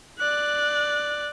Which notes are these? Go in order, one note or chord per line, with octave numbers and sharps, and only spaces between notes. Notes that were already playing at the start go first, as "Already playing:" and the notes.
D5 F#6